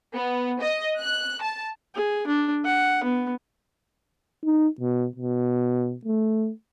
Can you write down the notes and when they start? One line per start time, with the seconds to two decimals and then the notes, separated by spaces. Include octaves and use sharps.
0.15 B3
0.60 D#5
0.98 F#6
1.41 A5
1.95 G#4
2.27 D4
2.65 F#5
3.03 B3
4.45 D#4
4.80 B2
5.16 B2
6.05 A3